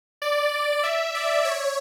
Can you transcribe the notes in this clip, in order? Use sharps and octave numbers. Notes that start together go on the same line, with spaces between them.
D5
E5
D5
C#5